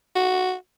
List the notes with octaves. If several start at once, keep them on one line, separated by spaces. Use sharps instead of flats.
F#4